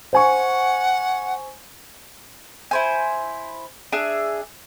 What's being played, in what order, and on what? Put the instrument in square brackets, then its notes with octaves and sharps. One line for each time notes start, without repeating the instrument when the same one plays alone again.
[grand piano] C5 G#5 C#6 [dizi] F#5
[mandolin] E4 C5 G#5
D4 G#4 E5